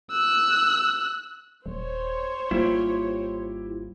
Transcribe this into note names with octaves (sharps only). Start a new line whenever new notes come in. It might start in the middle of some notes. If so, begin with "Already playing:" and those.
E6 F#6
D#1 C5 C#5
G#1 G3 A#3 E4 F4 G4